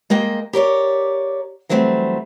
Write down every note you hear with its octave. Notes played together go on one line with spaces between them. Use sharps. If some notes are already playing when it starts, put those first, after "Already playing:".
G#3 A#3 D#5 G5
G4 A#4 C#5 D5
E3 F#3 G3 A3 C4